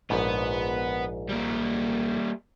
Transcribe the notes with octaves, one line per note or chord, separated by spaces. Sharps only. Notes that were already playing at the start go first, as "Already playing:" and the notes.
A#1 G#2 B3 B4
G3 A#3